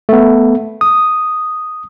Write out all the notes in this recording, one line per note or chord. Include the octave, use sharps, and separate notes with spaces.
A3 B3
D#6